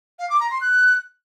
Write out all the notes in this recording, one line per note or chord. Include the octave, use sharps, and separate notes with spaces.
F5
D6
A#5
C6
F#6